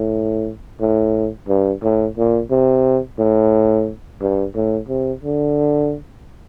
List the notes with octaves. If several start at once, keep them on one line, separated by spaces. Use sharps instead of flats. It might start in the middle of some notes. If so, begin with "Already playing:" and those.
Already playing: A2
A2
G2
A2
A#2
C3
A2
G2
A2
C3
D3